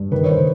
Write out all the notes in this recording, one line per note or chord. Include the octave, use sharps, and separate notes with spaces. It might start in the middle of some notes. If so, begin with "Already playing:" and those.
Already playing: G2
D#3 B4
C#5
C5
D#3